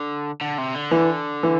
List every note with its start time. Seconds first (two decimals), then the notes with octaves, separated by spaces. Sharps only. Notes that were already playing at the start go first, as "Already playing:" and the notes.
Already playing: D3
0.41 D3
0.58 C3
0.75 D3
0.91 E3
1.43 E3